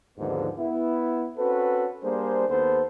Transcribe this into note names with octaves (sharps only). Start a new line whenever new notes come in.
D#2 G#2 D3 F3 G#3 B3
B3 E4
C4 C#4 F#4 A4 B4
G3 A#3 D4 G#4 C5
D#2 A#3 B3 A4 C5